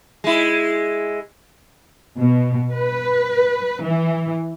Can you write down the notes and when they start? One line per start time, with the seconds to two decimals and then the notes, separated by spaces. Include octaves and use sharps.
0.24 G#3 E4
2.19 B2
2.73 B4
3.83 E3